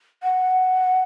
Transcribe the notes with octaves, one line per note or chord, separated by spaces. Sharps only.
F#5